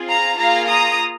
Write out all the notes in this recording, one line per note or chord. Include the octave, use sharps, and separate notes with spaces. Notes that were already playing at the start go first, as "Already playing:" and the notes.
Already playing: C4 F4 G#4
F5 A#5
A#3 F4 G#4 F5 A#5
A#5 D#6